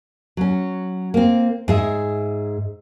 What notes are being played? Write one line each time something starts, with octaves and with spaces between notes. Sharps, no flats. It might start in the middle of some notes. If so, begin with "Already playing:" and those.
F#3 C#4
A#3 C4
G#2 G#4 E5